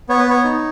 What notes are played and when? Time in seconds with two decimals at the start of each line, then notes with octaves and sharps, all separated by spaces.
0.09 B3 C#5
0.19 B4
0.27 B3 C#5
0.45 D#4